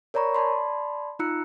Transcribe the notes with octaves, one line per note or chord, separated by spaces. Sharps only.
A#4 C#5 D5 A#5 B5 C#6
D5 A5 B5 C6
D#4 F4 A#5 E6 F#6 C#7